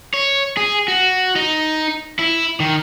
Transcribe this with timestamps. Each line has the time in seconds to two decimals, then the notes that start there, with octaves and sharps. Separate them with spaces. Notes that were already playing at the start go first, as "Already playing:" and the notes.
0.14 C#5
0.57 G#4
0.88 F#4
1.36 D#4
2.19 E4
2.60 D#3